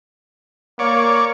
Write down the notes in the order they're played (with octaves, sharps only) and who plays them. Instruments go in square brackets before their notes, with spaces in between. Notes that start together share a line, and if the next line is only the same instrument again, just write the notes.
[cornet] A#3 [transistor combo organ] C#5 D5